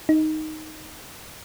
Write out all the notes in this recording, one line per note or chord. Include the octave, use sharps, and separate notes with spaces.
D#4